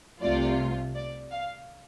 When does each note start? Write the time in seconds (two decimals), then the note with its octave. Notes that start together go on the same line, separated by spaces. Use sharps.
0.21 C2 C3 A3 F4 D5
0.94 D5
1.31 F5